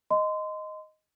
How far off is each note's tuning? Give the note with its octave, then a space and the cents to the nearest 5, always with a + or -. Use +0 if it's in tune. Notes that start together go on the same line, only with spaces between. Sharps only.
D#5 +0 C6 -25